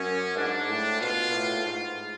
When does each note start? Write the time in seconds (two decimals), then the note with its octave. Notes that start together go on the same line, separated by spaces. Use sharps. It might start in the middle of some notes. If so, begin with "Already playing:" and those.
Already playing: F#2 C#4
0.37 G#2 D4
0.69 A2
1.00 B2 F4
1.32 A2
1.65 G#2 F4